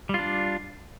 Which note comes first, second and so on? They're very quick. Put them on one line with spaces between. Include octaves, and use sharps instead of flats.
G3 F4 D4